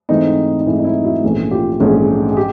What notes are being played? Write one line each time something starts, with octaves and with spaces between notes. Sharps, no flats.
G#2 E3 A3 C4 D#4
D#4
G#2 E3 A3 C4 E4
D#4
E4
E4 F#4
A#1 G#2 E3 A3 C#4
F4 G4
A#1 G#2 E3 A3 C#4
G#4
G4